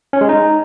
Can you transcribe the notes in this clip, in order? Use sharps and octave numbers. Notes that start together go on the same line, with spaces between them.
C#4
G#3
D#4